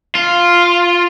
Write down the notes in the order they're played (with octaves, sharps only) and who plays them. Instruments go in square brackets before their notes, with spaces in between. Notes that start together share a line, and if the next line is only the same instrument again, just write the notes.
[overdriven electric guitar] F4